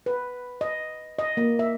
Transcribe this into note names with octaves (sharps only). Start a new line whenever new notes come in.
B4
D#5
D#5
A#3
E5